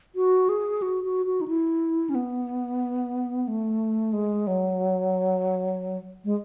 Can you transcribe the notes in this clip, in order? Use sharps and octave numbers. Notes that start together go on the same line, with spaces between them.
F#4
G#4
F#4
F#4
F#4
D#4
E4
C#4
B3
A3
G#3
F#3
G#3